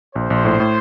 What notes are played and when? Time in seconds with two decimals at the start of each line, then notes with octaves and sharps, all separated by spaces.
0.16 A#1 C5
0.30 A#1
0.45 A2
0.60 A2